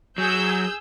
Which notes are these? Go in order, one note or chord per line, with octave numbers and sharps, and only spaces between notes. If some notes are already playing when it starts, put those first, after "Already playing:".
F#3 G#4 E6 G6